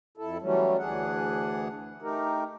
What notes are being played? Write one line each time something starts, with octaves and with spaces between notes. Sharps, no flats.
F2 E4 A4
E3 F#3 G3 A3 C#4
D2 E3 D4 G#4 F#5
A3 D#4 G4 A#4